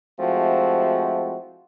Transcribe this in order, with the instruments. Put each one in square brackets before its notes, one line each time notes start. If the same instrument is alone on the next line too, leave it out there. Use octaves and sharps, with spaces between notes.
[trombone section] F3 G#3 A3 C4 E4 F#4